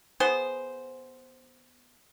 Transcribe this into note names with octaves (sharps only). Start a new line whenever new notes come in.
B3 G#4 C5